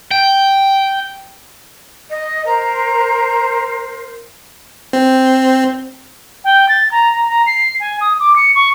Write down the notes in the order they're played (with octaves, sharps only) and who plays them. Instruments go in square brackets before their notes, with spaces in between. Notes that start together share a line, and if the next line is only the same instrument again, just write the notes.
[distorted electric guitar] G5
[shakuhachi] D#5
[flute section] A#4 C5 [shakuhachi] A#5
[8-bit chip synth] C4
[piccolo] G5
A6
A#5
A#5
A#5
C7
G#5
D#6
D6
C#7
C#6